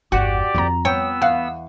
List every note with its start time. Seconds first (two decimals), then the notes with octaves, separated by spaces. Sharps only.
0.12 G1 E2 F#4 G4 D5 F#5
0.55 F2 C4 F4 A#5
0.85 B3 C#5 G5 E6
1.22 E2 F5 F#5